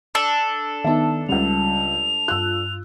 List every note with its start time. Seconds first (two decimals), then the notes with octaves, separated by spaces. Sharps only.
0.15 D4 A4
0.84 D#3 B3 D#4 E5 A5
1.29 C#2 C#3 G3 F7
2.28 G2 F4 E6 F#6